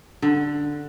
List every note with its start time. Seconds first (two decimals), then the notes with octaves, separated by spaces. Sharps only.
0.22 D3